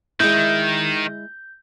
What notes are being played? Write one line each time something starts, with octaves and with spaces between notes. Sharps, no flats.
D#3 G#3 E4 G6